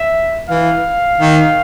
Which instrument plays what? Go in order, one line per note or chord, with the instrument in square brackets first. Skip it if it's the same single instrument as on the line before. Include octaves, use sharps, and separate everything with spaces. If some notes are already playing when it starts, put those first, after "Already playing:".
Already playing: [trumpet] E5
[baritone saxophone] E3 [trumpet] F5
[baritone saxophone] D#3